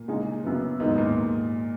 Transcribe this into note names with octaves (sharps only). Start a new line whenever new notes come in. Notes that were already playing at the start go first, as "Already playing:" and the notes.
Already playing: A#2
C#3 G#3 D#4 G#4
F#2 C#3 F#3 B3
D#2 G#2 D#3 F#3 B3 D#4
A#2